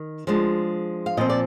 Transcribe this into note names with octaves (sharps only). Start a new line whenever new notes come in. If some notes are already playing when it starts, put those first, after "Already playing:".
Already playing: D#3
F3 G#3 D4
F5
A#2 F3 C4 D#5
D5